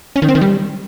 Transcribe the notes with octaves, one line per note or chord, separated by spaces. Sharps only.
C#4
D#3
C4
D#3
G3